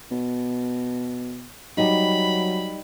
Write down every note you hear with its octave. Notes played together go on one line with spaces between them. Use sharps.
B2
F#3 G3 D#4 B5